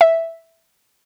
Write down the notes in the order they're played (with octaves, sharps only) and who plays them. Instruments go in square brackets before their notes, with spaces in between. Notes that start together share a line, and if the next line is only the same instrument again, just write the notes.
[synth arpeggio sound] E5